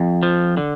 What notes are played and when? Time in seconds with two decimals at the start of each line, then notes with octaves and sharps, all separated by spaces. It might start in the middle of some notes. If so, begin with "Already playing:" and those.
Already playing: F2
0.23 F3
0.57 D3